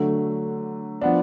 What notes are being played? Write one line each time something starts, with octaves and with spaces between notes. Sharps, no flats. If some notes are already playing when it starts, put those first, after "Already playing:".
Already playing: D3 F#3 A3
F3 B3 D4